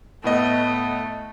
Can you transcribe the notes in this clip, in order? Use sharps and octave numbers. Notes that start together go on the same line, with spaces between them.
A2 A3 B3 D#5